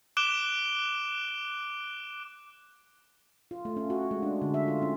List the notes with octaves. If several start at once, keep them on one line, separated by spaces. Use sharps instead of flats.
D6 F#6 D7 E7 G7
F4
A3
C#4
F#4
G#3
D4
D3
E5
F4
C#4